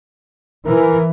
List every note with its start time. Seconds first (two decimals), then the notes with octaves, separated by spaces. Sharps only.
0.66 E3 A#4